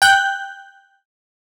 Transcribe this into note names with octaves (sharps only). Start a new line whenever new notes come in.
G5 F#6 G6